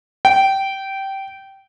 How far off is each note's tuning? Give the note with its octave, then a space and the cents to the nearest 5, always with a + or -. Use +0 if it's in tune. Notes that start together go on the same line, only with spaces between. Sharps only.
G5 -15